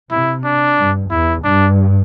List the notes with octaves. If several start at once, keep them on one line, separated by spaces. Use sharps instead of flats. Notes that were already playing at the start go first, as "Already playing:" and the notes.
C3 E4
D4
G2
E2 E4
G2 D4